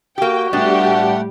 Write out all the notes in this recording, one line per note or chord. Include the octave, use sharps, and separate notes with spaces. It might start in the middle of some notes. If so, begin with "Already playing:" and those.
A#3 F#4 G4 G5
A2 G3 A3 B3 D4 G4 F#5